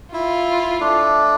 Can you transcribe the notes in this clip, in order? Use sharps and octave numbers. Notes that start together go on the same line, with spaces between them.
E4 F4
A3 D4